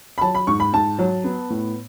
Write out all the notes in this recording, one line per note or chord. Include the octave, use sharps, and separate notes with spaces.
B5
F#3 A5
B5
G#2 C#6
B5
G#2 A5
F#3
B3
A2